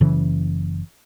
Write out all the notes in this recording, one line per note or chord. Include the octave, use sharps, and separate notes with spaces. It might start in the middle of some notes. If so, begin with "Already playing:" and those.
F#1 C#3 E3